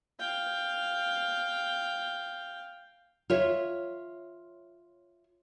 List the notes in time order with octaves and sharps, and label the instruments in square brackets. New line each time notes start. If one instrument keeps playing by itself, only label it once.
[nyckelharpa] F5 G5
[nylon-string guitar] F4 C#5 E5